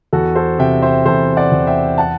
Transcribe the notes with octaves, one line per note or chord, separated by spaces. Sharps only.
E2 F#4 A4
A4 C5
C3 E5 G5
C5 E5
E2 A4 C5
D5 F#5
E2
E5 G5
F#5 A5